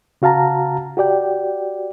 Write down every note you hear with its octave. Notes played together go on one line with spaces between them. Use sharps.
C#3 F#4 F5 A5 A#5
F#4 G4 D5 G5